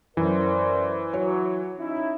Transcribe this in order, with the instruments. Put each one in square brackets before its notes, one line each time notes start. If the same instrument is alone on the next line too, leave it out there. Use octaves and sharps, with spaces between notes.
[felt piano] F#2 [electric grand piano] E3 [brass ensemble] A#4 C5 D5
[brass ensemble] F#3 [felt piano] C#5
[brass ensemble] C#4 D#4 E4